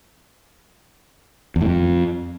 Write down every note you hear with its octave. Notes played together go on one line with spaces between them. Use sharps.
E2
A2
F2